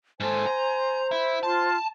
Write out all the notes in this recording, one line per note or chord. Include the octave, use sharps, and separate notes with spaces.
G#2 A4 C5 G#5 C6
A#5
E4
F4 A5 C6